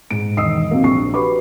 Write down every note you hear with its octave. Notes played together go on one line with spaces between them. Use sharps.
G#2 D7
E1 D#3 D#5 D#6 E6 C7
C3 F#3 A#3 C4
A#1 C#6 C7
F#4 G4 B4 B5 C#6 D6